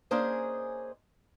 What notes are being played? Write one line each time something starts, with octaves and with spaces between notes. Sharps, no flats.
A#3 C#4 D4 G#4 C5 D#5